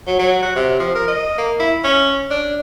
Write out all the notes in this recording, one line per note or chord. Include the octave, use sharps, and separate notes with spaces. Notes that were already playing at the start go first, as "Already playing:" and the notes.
F#3
F#3
F#4
C3
F3
A#4
D#5
A#3
E4
C#4
D4